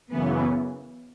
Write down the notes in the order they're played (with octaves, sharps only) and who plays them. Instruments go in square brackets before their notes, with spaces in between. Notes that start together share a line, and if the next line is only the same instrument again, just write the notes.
[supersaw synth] F#2 C#3 E3 [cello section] B3